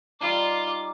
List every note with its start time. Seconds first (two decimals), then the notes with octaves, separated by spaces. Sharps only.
0.21 G3 D#4 F4 D6